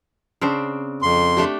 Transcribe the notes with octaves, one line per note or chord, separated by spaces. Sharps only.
C#3 C4 D4
F2 C6
A3 D4 G4